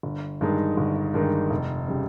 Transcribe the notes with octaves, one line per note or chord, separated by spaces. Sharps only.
G1
G2 D#3 G#3 D#4
G1
G2 D#3 G#3 D#4
F1
C#3 G3